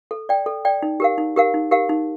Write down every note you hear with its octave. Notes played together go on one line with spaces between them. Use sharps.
A4
D5 G5
A4
D5 G5
D#4
G4 A#4 F5
D#4
G4 A#4 F5
D#4
G4 A#4 F5
D#4